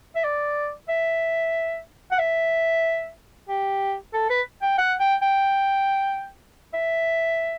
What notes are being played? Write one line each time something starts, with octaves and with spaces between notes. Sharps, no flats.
E5
D5
E5
F#5
E5
G4
A4
B4
G5
F#5
G5
G5
E5